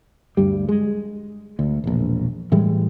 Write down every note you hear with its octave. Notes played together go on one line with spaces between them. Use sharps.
D2 G2 G3
G#3
D2
E1 A#1
A2 E3 G3 G#3